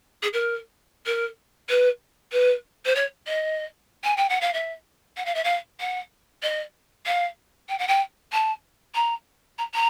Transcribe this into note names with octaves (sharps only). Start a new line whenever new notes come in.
G#4
A#4
A#4
B4
B4
C5
C#5
D#5
G#5
G5
F#5
F5
E5
F#5
F5
E5
F5
F#5
D#5
F5
G5
F#5
G5
A5
A#5
A#5
A#5